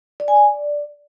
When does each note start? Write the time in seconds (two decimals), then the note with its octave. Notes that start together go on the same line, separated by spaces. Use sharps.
0.20 D5
0.28 G#5
0.36 D5